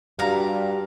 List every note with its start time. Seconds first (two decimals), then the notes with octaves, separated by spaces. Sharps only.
0.19 G2 G3 F#4 G4 F5 A#5